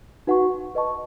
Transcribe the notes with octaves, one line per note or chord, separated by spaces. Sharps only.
D#4 F#4 B4 F#5 C#6
B4 D#5 A5 C#6